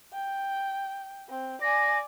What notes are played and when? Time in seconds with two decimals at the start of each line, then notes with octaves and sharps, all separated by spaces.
0.13 G5
1.29 C4
1.62 D5 G#5 A#6